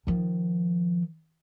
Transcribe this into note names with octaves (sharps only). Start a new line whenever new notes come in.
D#3 F3